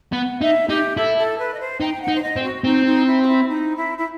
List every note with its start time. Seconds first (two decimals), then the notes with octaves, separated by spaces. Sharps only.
0.12 B3 F#5
0.41 D#4 E5
0.68 D#4 G4
0.97 E4 A4
1.17 A4
1.38 B4
1.54 D#5
1.60 C5
1.81 D#4 G5
2.02 F#5
2.08 D#4
2.15 C5
2.22 D#5
2.36 C4
2.43 F#4
2.64 C4 D#4
2.86 D#4
3.06 E4
3.22 F#4
3.27 E4
3.48 D#4
3.76 E4
3.98 E4